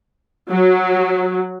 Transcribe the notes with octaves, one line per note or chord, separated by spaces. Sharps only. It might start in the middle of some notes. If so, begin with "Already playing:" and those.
F#3